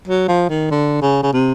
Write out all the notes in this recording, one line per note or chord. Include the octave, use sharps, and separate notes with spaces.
F#3
F3
D#3
D3
C#3
C#3
C3